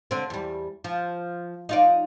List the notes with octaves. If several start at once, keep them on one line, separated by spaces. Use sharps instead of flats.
D3 C4
E2 G3
F3
D#4 F4 D5